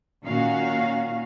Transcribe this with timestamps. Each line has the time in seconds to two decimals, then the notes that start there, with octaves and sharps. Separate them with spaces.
0.24 A#2 D#3 C#4 F#4 F5